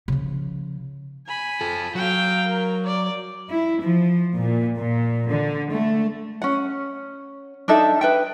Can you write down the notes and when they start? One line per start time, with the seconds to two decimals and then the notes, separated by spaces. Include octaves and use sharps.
0.08 C#3 F3
1.27 G#5 B5
1.61 F4 A4
1.95 F#3 F5 G5
2.46 A#4
2.85 D5
3.50 E4
3.82 F3
4.35 A#2
4.78 A#2
5.30 D3
5.72 A3
6.42 C#4 F#5
7.68 D4 D#4 A4 E5
8.01 B4 E5 G5